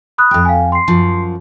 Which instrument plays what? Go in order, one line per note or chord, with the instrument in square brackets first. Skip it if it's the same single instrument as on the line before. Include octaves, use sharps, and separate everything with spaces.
[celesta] B5 D#6 F#6
[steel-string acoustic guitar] F2 G5
[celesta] F5 G#5
C6 C7
[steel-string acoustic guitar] F#2 F3